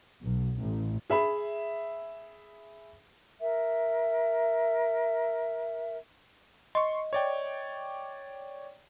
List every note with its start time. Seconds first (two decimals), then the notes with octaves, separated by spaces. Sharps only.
0.22 B1
0.59 A1
1.10 G#4 E5 B5
3.40 A#4 E5
6.75 D#5 C6 C#6
7.13 C#5 D5 G5